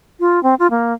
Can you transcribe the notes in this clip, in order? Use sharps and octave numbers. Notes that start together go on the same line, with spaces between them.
F4
C4
F4
A#3